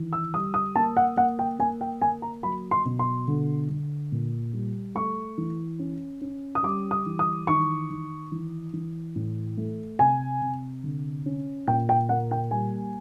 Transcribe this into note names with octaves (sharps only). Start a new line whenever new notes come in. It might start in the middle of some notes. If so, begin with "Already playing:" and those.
Already playing: D#3 E3
E6
G3 D#6
D#6
A#3 A5
F#5
A#3 F#5
G5
A#3 G#5
G5
A#3 G#5
A#5
F#3 B5
C6
B2
C6
D3
D3
A#2
G3
A3 C#6
E3
C#4
C#4
D#6
G3 D6
D#6
E3
D#6
D#3 C#6
D#3
E3
E3
A2
A3
C3 G#5
C3
D3
C#4
A#2 G5
G5
A#3 F#5
G5
G3 G#5